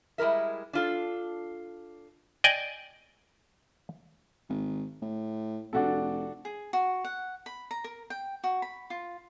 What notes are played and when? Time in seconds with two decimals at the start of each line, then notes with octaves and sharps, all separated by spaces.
0.18 G3 G#3 E4 A#4 E5
0.73 D4 F4 A4
2.44 D5 D#5 G5 G#5
4.49 G#1
5.02 A2
5.73 F1 D4 F#4 A4
6.45 G#4
6.73 F#4
7.05 F#5
7.46 B5
7.71 A#5
7.84 A#4
8.10 G5
8.44 F#4
8.62 B5
8.90 F4